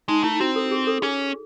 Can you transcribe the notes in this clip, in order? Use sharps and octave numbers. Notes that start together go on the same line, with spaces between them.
G#3 D#4
A3 E4
C4 F#4
A4
G#4
A4
C#4 G#4